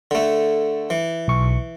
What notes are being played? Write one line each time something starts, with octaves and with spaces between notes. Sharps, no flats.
D3 A3
E3
B1 C#6